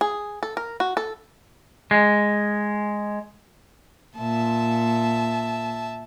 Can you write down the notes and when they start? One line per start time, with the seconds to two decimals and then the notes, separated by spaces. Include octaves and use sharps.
0.01 G#4
0.43 A4
0.57 A#4
0.80 F#4
0.97 A4
1.91 G#3
4.18 A#2 E5 A5